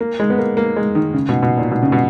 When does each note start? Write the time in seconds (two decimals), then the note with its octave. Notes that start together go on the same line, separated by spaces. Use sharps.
0.01 A#3
0.20 G#3
0.30 B3
0.38 A#3
0.57 A#3
0.76 G#3
0.95 D#3
1.14 C#3
1.29 B2
1.43 B2
1.57 A#2
1.72 B2
1.82 C#3
1.92 B2